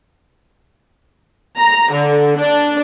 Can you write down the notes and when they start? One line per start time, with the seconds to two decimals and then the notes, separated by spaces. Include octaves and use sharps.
1.59 A#5
1.93 D3
2.38 D4